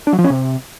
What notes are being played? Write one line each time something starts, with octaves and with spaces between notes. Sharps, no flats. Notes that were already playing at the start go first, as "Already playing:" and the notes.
D4
F#3
F3
C#4
C3